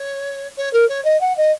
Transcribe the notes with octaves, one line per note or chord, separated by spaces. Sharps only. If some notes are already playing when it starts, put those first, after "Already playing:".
Already playing: C#5
C#5
A#4
C#5
D#5
F#5
D#5